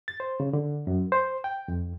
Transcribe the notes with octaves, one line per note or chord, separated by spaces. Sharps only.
A6
C5
C#3
D3
F#2
C5
G5
F2